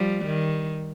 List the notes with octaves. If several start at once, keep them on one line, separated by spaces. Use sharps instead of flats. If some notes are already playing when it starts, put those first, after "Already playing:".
Already playing: F3 G3
D#3